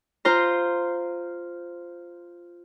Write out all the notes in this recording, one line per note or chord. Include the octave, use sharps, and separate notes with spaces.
F4 C5 A#5